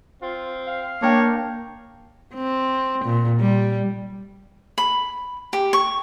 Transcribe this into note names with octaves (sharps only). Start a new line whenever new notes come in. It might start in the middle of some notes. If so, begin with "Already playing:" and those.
C4 F4
F5
A#3 D4 A#4 C#5 G5
C4
A#2
G3
B5
G4
C#6